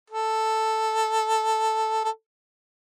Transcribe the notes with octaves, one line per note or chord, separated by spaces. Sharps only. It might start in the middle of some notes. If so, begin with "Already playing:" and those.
A4
A4